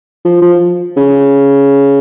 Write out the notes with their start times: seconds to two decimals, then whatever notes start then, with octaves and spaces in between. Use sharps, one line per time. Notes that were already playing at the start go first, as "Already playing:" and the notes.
0.25 F3
0.42 F3
0.97 C#3